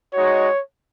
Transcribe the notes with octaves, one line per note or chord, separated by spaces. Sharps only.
G#3 D#4 F#4 C#5